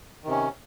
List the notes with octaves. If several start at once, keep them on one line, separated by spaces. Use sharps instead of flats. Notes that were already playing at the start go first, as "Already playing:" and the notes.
C3 D#3 C#4